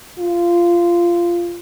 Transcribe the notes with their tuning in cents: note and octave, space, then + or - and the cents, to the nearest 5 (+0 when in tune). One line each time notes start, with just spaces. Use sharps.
F4 -15